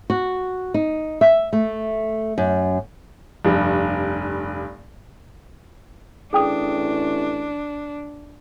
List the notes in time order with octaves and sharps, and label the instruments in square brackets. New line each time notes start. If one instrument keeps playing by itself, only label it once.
[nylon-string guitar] F#4
D#4
E5
A3
F#2
[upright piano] F1 G2
[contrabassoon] A1 [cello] D4 [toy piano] G#4 G5 D#6